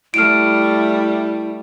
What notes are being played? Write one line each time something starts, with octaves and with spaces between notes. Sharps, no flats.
G3 A3 E4 F6 D7